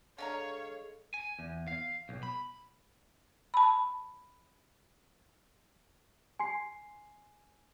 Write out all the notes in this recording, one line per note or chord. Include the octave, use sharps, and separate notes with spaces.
D3 G#3 G#4 A4 C#5 D#5 F5 A#5
G#5
E2
F5
B1
B5
A5 B5
G#5 C6 C7